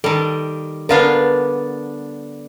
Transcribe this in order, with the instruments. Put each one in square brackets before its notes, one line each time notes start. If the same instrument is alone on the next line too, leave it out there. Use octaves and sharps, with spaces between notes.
[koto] D#3 G3 [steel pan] A4
[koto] D3 B3 D4 [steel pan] A#4 F5